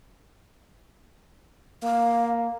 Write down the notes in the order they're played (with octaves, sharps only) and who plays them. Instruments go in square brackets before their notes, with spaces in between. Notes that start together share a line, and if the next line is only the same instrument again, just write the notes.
[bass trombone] A#3 [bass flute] F5